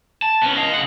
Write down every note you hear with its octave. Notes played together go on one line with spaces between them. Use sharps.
A5
B3 C#4
D#5 F5
C#3 F#5